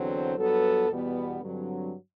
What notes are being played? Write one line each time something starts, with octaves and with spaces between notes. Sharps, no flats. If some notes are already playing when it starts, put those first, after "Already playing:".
Already playing: E2 D3 F#3 C4 C5
G2 F#3 B3 A4
E2 B2 G3 B3
G2 D3 F#3 C4